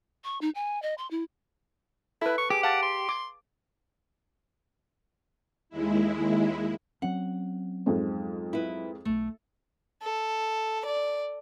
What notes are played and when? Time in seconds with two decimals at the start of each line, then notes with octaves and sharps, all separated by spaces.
0.24 C#6
0.41 D#4
0.55 G#5
0.82 D#5
0.98 C6
1.11 E4
2.21 E4 A4 B4
2.38 C#6
2.50 G4 G#4 D6
2.63 F5 F#5 A5
2.83 C6
3.09 D6
5.69 D#2 G#3 E4
7.02 F#3 C4 C#4 F#5
7.86 F2 G#2 C5
8.53 E4 B4
9.05 D1 B1 A3
10.03 A4
10.85 D5